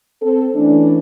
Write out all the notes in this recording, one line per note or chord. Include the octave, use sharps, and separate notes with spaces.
C4 A4
E3 A3 C#4 D4